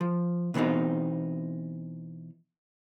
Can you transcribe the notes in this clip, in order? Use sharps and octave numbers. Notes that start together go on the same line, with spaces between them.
F3
B2 E3 B3 C4 D#4